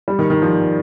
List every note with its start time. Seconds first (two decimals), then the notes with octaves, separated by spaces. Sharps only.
0.08 G3
0.19 D#3
0.30 D#3
0.42 F3